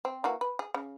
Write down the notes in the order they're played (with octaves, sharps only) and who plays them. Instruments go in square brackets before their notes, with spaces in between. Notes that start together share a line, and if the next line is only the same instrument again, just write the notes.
[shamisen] C4
E3 A#3 F#4
B4
G#4
C#3